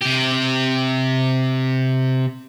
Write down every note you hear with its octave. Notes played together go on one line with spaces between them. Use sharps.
C3 G4